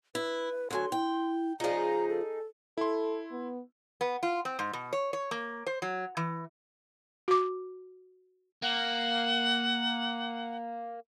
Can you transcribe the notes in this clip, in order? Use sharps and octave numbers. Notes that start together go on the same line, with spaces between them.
E4 B4
D2 F#3 A4 G#5 C6
E4 G5
C#3 F3 D#4 F4 G#4 A#5
A4
E4 A4 C6
B3
B3
F4
C4
G#2
B2
C#5
C#5
A#3
C5
F#3
E3
F#4 D6
A#3 F#5